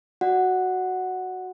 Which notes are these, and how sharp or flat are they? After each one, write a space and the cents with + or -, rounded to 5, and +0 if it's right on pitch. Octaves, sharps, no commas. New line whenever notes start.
F#4 +0 D5 +0 F#5 +0